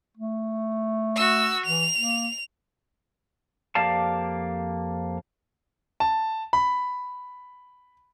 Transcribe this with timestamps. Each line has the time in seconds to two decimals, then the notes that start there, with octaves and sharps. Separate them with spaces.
0.17 A3
1.16 F#4 E6
1.65 E3 F7
1.97 A#3
3.75 F2 A#3 G4 D5 F5 A5
6.00 A5
6.53 B5